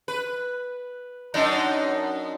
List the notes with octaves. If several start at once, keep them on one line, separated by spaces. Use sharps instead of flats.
B4
F#2 D4 D#4